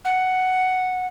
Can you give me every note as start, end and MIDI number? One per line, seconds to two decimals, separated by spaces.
0.04 1.06 78